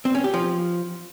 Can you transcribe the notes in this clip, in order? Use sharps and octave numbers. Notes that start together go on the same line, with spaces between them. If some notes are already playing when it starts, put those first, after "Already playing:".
C4
C#4
G4
F3